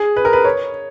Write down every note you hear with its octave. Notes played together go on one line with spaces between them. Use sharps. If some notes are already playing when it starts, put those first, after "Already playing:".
Already playing: G#4
B4
A#4
B4
C#5